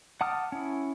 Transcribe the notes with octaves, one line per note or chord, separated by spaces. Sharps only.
F#5 A5 D6 D#6 F6
C#4 E4